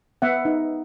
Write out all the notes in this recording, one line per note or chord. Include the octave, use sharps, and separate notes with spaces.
B3 E5 F#5
D#4